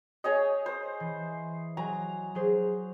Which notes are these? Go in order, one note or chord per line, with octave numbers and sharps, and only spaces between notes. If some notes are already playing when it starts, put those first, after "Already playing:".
G#4 C#5 D#5 G6
C5
E3
F#3 G#5 A#5
F#3 G#4 C5